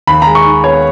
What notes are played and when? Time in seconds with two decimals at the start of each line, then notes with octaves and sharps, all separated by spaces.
0.07 D#2 B5
0.22 G#3 A#5
0.35 C#6
0.45 D#3
0.64 B3 C#5